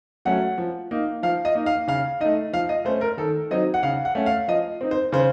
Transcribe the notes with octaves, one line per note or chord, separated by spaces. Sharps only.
F#3 A3 C#4 F#5
F3
A#3 D#4
F3 F5
D#5
A#3 D#4
F5
C#3 F5
A3 D#4 D#5
F3 F5
D#5
A3 C#4 C5
A#4
D#3 A4
F#3 C4 D#4 D#5
F#5
C#3 F5
F#5
A3 C#4
F5
F3 D#5
C4 D#4
C5
C#3 C5